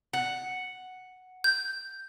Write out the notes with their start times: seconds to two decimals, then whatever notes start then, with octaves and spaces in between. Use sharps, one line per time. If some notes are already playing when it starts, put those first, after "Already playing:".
0.13 F#5
1.44 G6